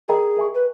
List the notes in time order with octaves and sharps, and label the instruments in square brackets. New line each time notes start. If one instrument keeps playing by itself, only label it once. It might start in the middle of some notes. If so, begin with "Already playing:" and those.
[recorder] G#4 [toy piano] A#4 D#5 G5 A#5
[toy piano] A#4 E5 G#5 C#6
[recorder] B4